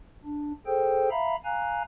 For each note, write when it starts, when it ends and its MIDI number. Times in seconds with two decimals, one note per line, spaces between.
0.24 0.53 62
0.67 1.09 68
0.67 1.09 69
0.67 1.09 72
0.67 1.09 79
1.11 1.35 76
1.11 1.35 77
1.11 1.35 82
1.11 1.35 83
1.45 1.83 77
1.45 1.83 80
1.45 1.83 82
1.45 1.83 90